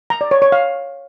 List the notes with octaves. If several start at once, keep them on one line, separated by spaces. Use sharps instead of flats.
A#5
D5
C#5
C#5
F5